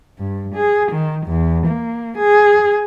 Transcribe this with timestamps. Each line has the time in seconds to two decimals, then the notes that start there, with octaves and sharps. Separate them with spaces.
0.19 G2
0.55 G#4
0.92 D#3
1.27 E2
1.67 A#3
2.18 G#4